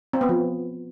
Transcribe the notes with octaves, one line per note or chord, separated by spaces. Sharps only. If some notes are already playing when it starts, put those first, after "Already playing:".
C4
B3
F3